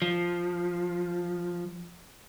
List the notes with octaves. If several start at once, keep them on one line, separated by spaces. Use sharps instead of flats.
F3